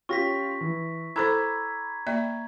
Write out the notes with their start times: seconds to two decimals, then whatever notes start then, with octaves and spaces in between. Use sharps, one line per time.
0.09 C#4 F4 G4 C#6 A#6 B6
0.61 E3
1.16 E4 A4 C5 A#5 B5 D6 E6 G#6
2.07 A#3 D5 E5